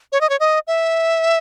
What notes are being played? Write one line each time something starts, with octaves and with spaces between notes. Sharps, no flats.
C#5
D#5
C#5
D#5
E5